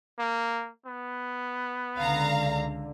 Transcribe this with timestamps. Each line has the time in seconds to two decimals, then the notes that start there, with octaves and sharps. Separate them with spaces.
0.19 A#3
0.86 B3
1.98 C#2 D3 F5 A#5